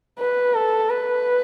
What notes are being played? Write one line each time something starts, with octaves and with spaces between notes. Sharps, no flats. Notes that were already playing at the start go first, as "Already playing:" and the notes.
B4
A4
B4